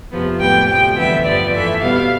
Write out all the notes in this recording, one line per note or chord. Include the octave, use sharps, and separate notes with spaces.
F2 C3 F3 B3
A2 G3 B3 G5
D2 C3 F3 G5
E2 D3 G3 B3 E5
G2 F3 B3 D5
F2 E3 A3 E5
B2 G3 B3 F5